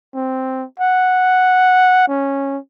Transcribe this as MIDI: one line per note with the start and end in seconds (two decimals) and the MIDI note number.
0.15 0.64 60
0.80 2.07 78
2.08 2.58 61